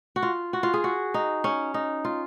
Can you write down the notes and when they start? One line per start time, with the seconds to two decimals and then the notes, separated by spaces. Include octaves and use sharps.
0.16 F#4
0.23 F4
0.53 F#4
0.63 F4
0.74 G#4
0.84 F#4
1.14 D#4
1.44 C#4
1.74 D#4
2.05 F4